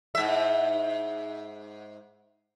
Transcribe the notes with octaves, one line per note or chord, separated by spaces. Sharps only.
G#2 E5